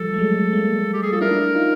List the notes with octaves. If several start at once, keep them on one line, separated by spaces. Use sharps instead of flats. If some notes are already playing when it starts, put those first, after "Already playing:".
Already playing: F3 G3 A4
A3
F#3 G#3
G#3 A#3
G4
G#4
F4 A4
D4 E4 A#4
D#4 F4